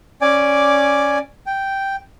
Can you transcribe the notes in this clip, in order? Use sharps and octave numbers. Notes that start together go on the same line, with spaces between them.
C#4 D5 G#5 D6
G5